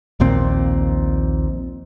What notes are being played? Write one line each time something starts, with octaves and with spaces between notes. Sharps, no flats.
A#1 D#2 A#2 C4